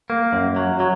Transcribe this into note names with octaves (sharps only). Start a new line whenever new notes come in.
A#3
F#2
F#3
F#3